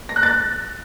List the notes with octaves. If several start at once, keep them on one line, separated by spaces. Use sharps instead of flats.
A#6
F#6
A6